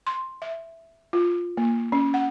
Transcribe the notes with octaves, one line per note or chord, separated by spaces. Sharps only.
C6
E5
F4
A#3
C#4
F#5